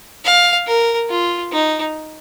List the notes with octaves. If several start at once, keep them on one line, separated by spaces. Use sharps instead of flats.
F5
A#4
F4
D#4